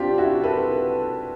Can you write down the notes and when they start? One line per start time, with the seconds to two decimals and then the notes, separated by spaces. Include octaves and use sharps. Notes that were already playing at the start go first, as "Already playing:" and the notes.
Already playing: C4 D4 F4 G4
0.18 E4 F#4
0.44 A4 B4